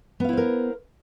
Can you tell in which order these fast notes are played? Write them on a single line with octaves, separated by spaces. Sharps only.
B3 F5 E4 C5 A#4